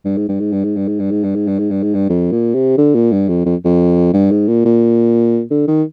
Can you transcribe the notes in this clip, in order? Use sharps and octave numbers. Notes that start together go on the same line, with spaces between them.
G2
G#2
G2
G#2
G2
G#2
G2
G#2
G2
G#2
G2
G#2
G2
G#2
G2
G#2
G2
F2
A#2
C3
D3
A#2
G2
F2
F2
F2
G2
G#2
A#2
A#2
D3
D#3